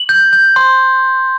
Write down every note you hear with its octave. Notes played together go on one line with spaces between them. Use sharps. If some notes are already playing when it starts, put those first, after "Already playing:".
Already playing: F#7
G6
G6
C6